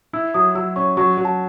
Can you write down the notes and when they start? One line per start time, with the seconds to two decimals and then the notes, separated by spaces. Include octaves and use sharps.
0.13 E4 E6
0.34 F#3 D#6
0.55 F#3 E6
0.76 C#4 C#6
0.97 F#3 C#6
1.18 F#3
1.25 A5